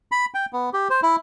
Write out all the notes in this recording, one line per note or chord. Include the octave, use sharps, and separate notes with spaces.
B5
G5
B3
G4
C5
E4